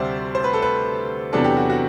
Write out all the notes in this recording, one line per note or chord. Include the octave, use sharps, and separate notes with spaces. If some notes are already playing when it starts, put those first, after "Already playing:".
Already playing: D2 C3 G3 C4 C5 D5 E5
C5
B4
A4
B4
E2 C3 F#3 B3 D4 A4
G4
F#4
F#4